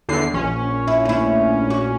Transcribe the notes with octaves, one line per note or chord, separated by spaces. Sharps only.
E2 D3 C7
A#1 C#4
E4
D2 E4
F#4